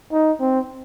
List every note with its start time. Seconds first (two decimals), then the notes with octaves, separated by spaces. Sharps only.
0.13 D#4
0.40 C4